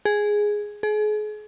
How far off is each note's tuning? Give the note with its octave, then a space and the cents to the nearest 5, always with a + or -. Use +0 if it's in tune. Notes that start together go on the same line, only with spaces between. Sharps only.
G#4 +0
G#4 +35